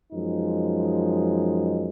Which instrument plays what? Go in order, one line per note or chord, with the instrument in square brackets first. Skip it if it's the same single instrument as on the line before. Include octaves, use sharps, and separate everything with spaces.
[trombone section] F#2 F3 G#3 D#4